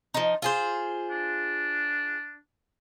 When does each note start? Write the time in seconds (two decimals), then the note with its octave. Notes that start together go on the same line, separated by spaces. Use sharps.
0.14 F3 D#4
0.42 F4 G#4 C5
1.11 D4